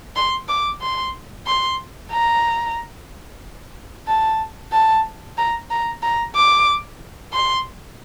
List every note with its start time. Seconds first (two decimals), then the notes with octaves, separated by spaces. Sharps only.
0.16 C6
0.49 D6
0.82 C6
1.47 C6
2.12 A#5
4.07 A5
4.72 A5
5.38 A#5
5.70 A#5
6.03 A#5
6.36 D6
7.33 C6